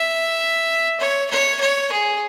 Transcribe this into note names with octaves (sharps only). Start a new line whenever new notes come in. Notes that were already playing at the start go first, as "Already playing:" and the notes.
Already playing: E5
C#5
C#5
C#5
G#4